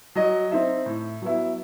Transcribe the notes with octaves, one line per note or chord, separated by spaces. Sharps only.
F#3 D#5
C4 D#4 E5
A2
F#3 B3 E4